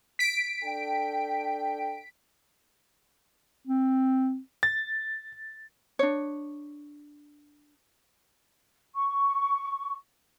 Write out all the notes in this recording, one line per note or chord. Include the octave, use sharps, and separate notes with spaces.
B6 D7
D4 A4 G5
C4
A6
D4 C#5
C#6